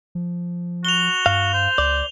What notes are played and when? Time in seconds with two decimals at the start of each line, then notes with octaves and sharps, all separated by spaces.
0.15 F3
0.85 F#4 F7 G7
1.26 G2 F5
1.54 C5
1.78 C#2 D5